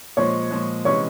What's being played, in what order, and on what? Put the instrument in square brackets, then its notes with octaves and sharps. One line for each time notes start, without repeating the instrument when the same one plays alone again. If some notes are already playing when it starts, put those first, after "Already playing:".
[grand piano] A#2 F3 G#3 [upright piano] C#5 C#6
[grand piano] A#2 F3 G#3
[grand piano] C3 E3 G#3 C#4 [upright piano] C#5 C#6